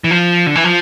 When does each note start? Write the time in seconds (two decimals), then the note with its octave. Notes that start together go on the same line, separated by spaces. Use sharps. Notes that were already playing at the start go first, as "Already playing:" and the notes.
0.04 E3
0.11 F3
0.47 D3
0.55 E3
0.64 F3